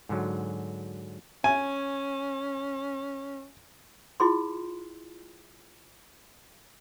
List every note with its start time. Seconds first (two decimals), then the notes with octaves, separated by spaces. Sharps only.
0.09 G#2 D3 F#3
1.44 C#4 G#5
4.20 E4 F4 G#4 C6